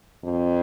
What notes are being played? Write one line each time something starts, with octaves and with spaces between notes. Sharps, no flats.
F2